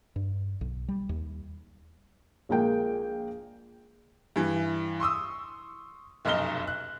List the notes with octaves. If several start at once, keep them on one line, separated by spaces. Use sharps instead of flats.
G2
B1
G3
D#2
A#1 G#3 A#3 G5
G2 E3
C6 C#6 D#6 E6
F1 B1 F#2 D#5 F6 G7
F#6